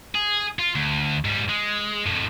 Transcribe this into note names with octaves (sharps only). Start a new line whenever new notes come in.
G#4
F4
D2
G#2 G3
G#3
F2 A2